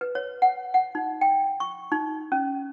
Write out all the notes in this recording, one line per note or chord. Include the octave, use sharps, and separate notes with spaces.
B4
C#5
F#5
F#5
D#4
G5
C#6
D#4
C#4